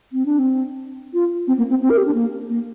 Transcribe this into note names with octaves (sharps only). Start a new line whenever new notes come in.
C4
D4
C4
F4
C4
A#3
C4
C4
A#4
G4
D4
A#3
A#3